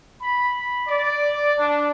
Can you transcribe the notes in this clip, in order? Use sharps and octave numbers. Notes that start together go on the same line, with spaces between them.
B5
D5
D4